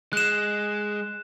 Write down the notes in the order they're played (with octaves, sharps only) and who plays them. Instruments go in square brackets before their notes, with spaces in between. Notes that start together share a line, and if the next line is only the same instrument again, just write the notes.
[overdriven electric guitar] G#3 [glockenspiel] F#6 E7